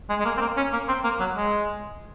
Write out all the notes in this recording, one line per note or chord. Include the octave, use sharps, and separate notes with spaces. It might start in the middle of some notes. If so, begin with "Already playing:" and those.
G#3
G#3
A#3
C4
A#3
C#4
A#3
C4
A#3
F#3
G#3